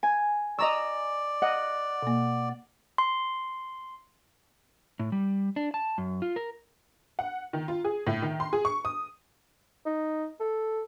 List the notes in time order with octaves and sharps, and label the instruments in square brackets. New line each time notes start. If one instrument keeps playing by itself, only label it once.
[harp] G#5
[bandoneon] D5 [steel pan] D#5 A#5 E6 [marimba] C#6
[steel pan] D#5 [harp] F#5
[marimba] B2 A#3
[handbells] C6
[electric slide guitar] A2
G3
D4
A5
F#2
F4
A#4
[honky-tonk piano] F#5
D#3
F4
G#4
A2
D#3
C6
G#4
C#6
D#6
[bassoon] D#4
A4